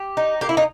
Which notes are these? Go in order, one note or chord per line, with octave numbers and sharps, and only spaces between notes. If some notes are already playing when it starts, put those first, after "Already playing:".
Already playing: G4
D#4
A#3 G4
E4
D#4